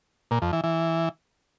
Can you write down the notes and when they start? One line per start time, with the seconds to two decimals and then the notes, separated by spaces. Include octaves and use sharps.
0.31 A#2
0.42 F2
0.53 E3
0.64 E3